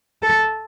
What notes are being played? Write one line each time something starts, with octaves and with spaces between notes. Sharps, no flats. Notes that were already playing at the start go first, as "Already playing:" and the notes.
A4